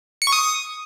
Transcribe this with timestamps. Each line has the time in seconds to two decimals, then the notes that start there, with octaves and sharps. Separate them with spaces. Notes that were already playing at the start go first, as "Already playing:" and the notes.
0.22 C#7
0.27 C#6
0.32 D#6